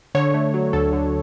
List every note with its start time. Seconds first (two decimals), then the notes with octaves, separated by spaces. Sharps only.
0.15 D3 C#5
0.34 A3
0.54 F#3
0.73 D2 A4
0.93 D3